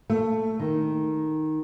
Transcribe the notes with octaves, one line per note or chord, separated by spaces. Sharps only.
A3
D#3